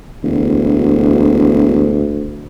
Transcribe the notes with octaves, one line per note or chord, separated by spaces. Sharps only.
E1 D2